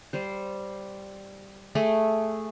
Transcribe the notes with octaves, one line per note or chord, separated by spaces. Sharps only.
G3 C5
A3 G#4